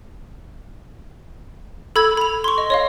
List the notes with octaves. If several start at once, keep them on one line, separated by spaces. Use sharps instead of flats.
A4 B5 E6 G#6
B5 F7
C6 C#6
D#5
C#5 D#5 F5